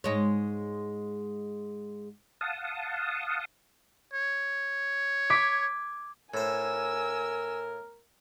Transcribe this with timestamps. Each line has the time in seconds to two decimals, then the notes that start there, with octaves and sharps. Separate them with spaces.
0.04 G#2 G#3 C#5
2.41 F5 F#5 A5 D#6
4.13 C#5
5.30 D6 G#6 B6
6.34 A2 A#4 C5 G#5 E6